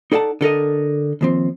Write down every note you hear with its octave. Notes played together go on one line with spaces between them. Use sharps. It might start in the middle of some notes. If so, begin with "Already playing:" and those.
D#4 A4 D5 F#5 A5
D3 A4 A#4 D#5
D#2 F3 C4